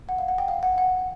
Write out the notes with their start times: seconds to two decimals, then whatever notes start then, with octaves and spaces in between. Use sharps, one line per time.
0.09 F#5
0.18 F5
0.28 F#5
0.38 G5
0.48 F5
0.63 F#5
0.78 F#5